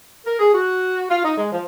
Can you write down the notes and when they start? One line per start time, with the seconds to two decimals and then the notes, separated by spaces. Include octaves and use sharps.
0.25 A#4
0.39 G#4
0.54 F#4
1.09 F4
1.23 D#4
1.38 G#3
1.52 F3